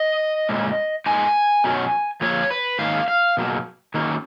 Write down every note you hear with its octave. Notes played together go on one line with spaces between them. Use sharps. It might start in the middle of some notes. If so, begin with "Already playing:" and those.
Already playing: D#5
A#2 G#3 C#4
A#2 G#3 B3 D#4 G#5
B2 F#3 C#4
A#2 F3 A#3 C#5
B4
G#2 D#3 A#3 C#4 F5
F5
B2 F#3 A#3
D#3 F#3 A#3 C#4